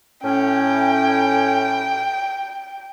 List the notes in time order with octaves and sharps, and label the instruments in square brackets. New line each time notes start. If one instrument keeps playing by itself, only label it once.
[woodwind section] A2 C#4 [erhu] G5